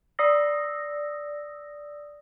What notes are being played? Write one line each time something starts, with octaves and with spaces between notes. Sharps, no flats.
D5 D#6 E6 A#6